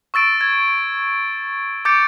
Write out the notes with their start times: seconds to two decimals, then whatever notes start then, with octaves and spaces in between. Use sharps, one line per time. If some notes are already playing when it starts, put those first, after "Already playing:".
0.14 C#6 E6 A6 D7
0.41 G#6
1.85 D6 G6 A6 C#7 D7